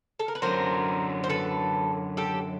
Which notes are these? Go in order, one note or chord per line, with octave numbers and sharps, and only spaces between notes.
A4
A#4
B4
F#2 D3 F#3 A#4 C5
C5
A4 B4
G4 A4